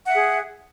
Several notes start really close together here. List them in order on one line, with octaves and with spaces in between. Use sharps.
F#5 E5 G#4